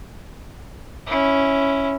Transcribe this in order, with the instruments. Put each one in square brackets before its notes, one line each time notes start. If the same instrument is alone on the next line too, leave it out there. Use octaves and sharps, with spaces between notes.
[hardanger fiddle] C#4 E4